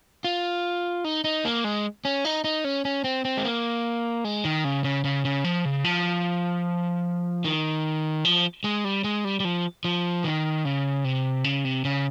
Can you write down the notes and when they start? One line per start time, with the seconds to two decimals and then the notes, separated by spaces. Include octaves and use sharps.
0.24 F4
1.04 D#4
1.24 D#4
1.45 A#3
1.64 G#3
2.05 C#4
2.25 D#4
2.44 D#4
2.64 C#4
2.85 C#4
3.04 C4
3.25 C4
3.37 G#3
3.45 A#3
4.24 G#3
4.45 D#3
4.64 C#3
4.84 C#3
5.04 C#3
5.25 C#3
5.44 F3
5.65 C#3
5.84 F3
7.44 D#3
8.25 F3
8.64 G#3
8.84 G3
9.04 G#3
9.25 G3
9.40 G3
9.45 F3
9.85 F3
10.24 D#3
10.65 C#3
11.04 C3
11.44 C#3
11.65 C3
11.85 C#3